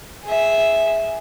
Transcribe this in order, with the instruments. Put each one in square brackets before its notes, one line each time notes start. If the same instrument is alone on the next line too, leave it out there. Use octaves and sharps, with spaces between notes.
[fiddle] G#4 E5